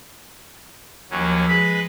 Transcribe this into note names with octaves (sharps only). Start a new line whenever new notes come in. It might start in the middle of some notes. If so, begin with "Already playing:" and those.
D#2 F3 F#3 C#4
G#3 B4 B5